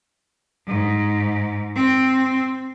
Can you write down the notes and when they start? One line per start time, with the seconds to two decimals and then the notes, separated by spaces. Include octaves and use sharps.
0.67 G#2
1.76 C4